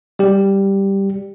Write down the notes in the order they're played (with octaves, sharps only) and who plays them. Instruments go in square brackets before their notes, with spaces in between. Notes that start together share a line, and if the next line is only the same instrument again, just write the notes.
[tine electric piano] G3 G4